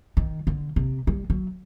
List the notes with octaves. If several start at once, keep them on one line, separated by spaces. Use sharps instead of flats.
D#3
D3
C3
G3
F#3